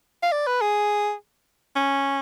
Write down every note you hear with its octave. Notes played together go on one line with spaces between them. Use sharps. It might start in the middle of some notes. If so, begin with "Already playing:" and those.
F5
D5
B4
G#4
C#4